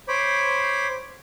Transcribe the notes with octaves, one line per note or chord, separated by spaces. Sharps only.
C5 C#5 B5 D6